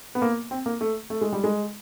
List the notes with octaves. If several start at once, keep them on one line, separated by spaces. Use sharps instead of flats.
B3
A#3
C4
A#3
A3
A3
G#3
G3
G#3